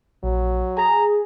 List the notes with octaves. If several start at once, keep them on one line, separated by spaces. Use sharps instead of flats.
A#1 F#3
G#4 G#5 A#5